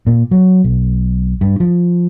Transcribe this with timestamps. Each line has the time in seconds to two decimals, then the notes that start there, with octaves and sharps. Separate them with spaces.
0.07 A#2
0.31 F#3
0.64 B1
1.41 G2
1.60 F3